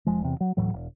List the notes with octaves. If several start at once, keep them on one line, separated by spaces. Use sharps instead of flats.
F1 F3 G#3
E2 C3
F#3
D1 A2 E3 F#3
E1